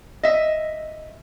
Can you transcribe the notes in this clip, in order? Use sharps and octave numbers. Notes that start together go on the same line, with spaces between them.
D#5 E5